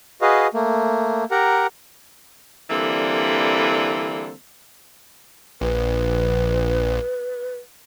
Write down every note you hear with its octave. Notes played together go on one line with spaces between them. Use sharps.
F#4 G#4 B4 D#5 F5
A3 A#3
G4 A#4 F#5 A#5
D3 E3 G3 A#3 C4 A4
A#1 B4